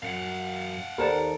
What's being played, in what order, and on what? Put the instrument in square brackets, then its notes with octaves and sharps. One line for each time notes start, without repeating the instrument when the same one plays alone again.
[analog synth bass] F#2 [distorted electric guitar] F5 F#5
[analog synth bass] D#2 [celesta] G4 C5 D5 [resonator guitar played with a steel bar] A4 A#4